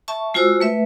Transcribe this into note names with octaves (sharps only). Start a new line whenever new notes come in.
E5 A5 C#6
G#3 F4 F#4 C5 E6
A3 B4 E5